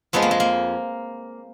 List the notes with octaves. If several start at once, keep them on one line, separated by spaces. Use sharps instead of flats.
F2 F3 G#3 B3
A#3
G#3
A#3